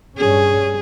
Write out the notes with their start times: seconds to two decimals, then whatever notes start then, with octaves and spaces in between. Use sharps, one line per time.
0.18 G2 C#4 G#4